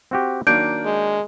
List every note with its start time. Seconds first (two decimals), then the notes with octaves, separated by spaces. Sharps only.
0.11 C4 F#4 G4
0.47 D#3 F#3 A#3 D4 G6 D7
0.85 G#3